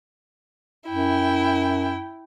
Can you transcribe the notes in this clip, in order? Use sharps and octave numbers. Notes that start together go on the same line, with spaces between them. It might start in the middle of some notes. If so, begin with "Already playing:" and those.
F#2 E4 G5